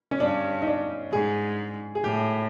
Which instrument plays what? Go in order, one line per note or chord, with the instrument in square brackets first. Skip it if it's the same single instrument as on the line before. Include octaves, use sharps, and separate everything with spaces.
[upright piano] C#4
[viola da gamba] G2 [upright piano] D4
[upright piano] D#4
D4
[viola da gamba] G#2 [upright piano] G#4
[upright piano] G#4
[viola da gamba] A2 [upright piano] G4